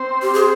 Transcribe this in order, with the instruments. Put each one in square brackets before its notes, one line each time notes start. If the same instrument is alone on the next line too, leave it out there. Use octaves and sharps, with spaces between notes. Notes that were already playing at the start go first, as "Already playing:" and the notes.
Already playing: [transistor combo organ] C4 C5
[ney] G4
G#4